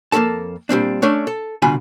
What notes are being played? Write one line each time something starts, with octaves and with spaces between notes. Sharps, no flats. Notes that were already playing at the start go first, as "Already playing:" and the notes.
F2 A#3 G4 A4 A5
A#2 G3 C4 D4
A3 C#4 D4 C#5
A4
C2 B2 D3 F4 G#5 B5